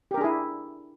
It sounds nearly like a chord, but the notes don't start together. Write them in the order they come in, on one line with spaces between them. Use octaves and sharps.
G4 A#4 D4 G#4 E4